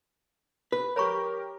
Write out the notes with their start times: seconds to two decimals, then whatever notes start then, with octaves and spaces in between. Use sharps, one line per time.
0.72 B4
0.96 G4 A#4 C#5 A#5 C#6